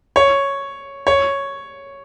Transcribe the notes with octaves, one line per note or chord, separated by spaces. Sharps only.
C#5
C#5